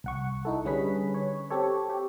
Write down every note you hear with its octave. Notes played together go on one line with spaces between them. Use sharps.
C2 F#5 C#6
D#4 E4 A4
D3 G3 C#4 G#4 B4 B6
C#5
C4 G4 A4 C#5
G4